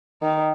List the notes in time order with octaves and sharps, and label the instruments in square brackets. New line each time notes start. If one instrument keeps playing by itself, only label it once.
[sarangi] D#3